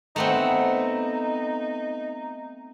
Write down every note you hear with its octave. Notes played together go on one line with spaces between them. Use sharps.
A3 B3 C4 D#4